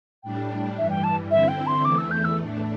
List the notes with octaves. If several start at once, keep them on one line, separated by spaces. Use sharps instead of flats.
A2 G3 D4 G5
G2 E3 G3 E5
G5
A5
D3 C4 E4 E5
G5
C6
E2 E3 A3 D6
E6
G6
E6
A2 A3 D4